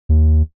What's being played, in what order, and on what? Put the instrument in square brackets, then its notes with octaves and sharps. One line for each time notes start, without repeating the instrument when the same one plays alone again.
[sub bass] D#2